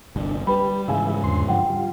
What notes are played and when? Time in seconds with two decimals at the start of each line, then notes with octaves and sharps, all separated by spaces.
0.16 G1 C2 D4
0.47 G3 G4 B4 B5
0.88 G#2 C#3 E3 G#4 E5 F5 G#5
1.24 E2 D3 C6
1.49 G2 D3 F3 F#5 G5
1.70 G3 F4